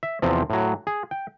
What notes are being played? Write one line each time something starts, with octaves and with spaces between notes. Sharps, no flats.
E5
E2 C3 F3 C4
A2 F#3
G#4
G5